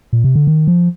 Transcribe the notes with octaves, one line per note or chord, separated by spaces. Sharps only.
A#2
C3
D3
D#3
F3